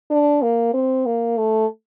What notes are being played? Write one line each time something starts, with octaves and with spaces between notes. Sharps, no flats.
D4
A#3
C4
A#3
A3